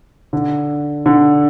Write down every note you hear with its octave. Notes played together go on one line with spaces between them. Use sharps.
D3
D3